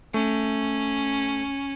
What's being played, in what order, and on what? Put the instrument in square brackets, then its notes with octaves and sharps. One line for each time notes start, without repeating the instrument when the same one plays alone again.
[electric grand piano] A3 [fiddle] C#4